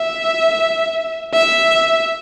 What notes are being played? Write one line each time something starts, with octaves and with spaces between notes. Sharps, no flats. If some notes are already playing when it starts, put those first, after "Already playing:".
Already playing: E5
E5